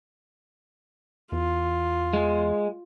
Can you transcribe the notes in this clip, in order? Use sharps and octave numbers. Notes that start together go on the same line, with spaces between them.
E2 F4
G#3